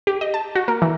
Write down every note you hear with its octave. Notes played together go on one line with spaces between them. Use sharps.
G4
D#5
A5
F#4
A#3
E3